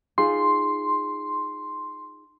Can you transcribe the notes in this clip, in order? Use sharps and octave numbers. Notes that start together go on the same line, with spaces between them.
D#4 F4 G#4 C6